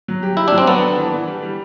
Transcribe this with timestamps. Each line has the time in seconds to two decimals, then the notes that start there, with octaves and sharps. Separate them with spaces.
0.08 F#3
0.23 G4
0.37 E4 G4
0.48 F#3 D4
0.58 C4
0.67 B3 D4
0.82 A4
0.98 E3
1.12 E3
1.27 G3
1.42 G3